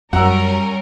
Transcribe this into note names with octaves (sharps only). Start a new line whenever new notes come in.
F#2 G3 C#4 A#4 F#5 A#5 E6